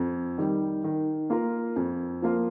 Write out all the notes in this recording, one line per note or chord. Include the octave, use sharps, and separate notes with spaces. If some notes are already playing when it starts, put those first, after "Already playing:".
Already playing: F2
D#3 G3
D#3
A#3 F4 A#4
F2
F3 A#3 F4